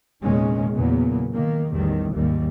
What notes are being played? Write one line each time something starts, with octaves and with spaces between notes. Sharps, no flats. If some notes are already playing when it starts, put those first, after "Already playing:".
F1 E2 A#2 D#3 G#3 C#4
E2 A#2 C#3 F#3 A#3 B3
D#3 A#3
A1 E2 D#3 G3
D#2 G#2 G3 A#3